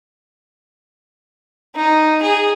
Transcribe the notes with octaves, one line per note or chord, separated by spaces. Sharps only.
D#4
G#4